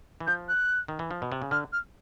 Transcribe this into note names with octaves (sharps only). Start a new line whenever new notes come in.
E3
F3 G6
F#6
D#3
E3
F3
B2
C3
C#3
D3 F6
F6